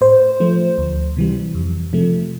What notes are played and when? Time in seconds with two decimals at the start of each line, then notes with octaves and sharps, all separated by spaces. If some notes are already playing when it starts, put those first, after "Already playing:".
0.01 A2 C5
0.40 F3 A3
0.78 D2
1.17 C3 E3 G3
1.55 F2
1.93 C3 F3 A3